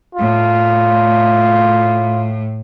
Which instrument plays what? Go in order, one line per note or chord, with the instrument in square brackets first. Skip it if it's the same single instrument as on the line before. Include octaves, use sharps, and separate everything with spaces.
[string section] A2 [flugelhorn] F4